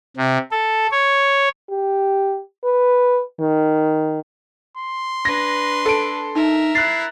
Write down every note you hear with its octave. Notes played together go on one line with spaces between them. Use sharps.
C3
A4
C#5
G4
B4
D#3
C6
D4 B4 A#6
A4 D7
D#4 A#4 E5
E4 F#6 A6 C7